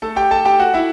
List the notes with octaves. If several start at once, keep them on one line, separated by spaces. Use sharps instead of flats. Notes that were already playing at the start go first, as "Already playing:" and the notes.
A3 A4
G4 G5
A4 A5
G4 G5
F#4 F#5
E4 E5